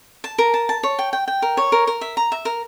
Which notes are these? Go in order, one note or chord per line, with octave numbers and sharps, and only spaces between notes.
A5
A#4
A5
A5
C#5
G5
G5
G5
A#4
C#5
A#4
A#4
E5
A#5
E5
A#4